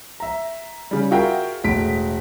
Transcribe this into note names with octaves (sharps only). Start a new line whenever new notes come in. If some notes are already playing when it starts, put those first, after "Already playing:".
E5 A#5
C#3 G3
F4 F#4 G#4 A#4 E5 G5
E1 A2 B6 D7